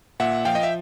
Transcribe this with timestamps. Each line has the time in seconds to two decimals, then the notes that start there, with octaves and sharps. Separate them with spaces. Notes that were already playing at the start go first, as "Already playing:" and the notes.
0.20 A#2 E5 F#5
0.45 F3 F5 G5
0.55 D#5
0.63 E5